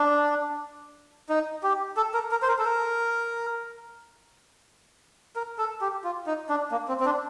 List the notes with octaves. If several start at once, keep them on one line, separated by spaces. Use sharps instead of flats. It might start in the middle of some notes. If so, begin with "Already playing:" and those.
Already playing: D4
D#4
G4
A4
A#4
A#4
C5
A#4
A4
A#4
A#4
A4
G4
F4
D#4
D4
A#3
C4
C4
D4